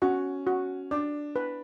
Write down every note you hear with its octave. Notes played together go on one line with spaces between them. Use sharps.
C#4 F#4
F#4
D4 D5
B4